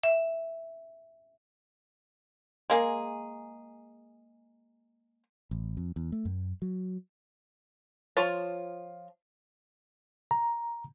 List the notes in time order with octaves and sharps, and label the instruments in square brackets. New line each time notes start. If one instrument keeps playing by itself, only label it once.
[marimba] E5
[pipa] G#3 A#3 G#4
[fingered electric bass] A1
F2
E2
A3
F#2
F#3
[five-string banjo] F3 F4 C#5 A5
[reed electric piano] A#5